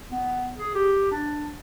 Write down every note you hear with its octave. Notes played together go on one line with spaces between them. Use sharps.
B3
G#4
G4
D4